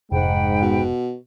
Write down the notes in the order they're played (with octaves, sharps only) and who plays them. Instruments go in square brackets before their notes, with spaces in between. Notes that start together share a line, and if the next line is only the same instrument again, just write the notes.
[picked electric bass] F1 [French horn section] G#2 [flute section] F#5 G5 B5
[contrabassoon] B2